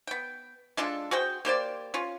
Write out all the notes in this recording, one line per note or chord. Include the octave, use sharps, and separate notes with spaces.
B3 G5
G#3 D4 F4 A4
F#4 G#4 C5 G5
A#3 G4 C5 D5
C#4 F4